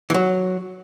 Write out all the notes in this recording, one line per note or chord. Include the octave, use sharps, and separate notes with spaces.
E3
F#3